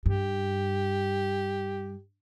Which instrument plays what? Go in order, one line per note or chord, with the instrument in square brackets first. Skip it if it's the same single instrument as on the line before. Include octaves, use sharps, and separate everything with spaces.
[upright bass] G2 [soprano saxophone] G4